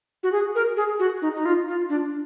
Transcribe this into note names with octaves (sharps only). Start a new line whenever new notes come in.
F#4
G#4
A#4
G#4
F#4
D#4
D#4
F4
F4
D4